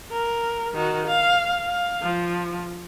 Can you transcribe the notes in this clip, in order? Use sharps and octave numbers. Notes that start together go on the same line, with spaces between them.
A#4
D#3 F#4
F5
F5
F3